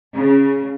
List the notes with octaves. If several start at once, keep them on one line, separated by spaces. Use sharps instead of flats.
C#3